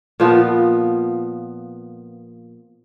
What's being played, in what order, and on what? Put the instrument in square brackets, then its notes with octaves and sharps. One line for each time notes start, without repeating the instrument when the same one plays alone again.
[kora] A#2 F3 B3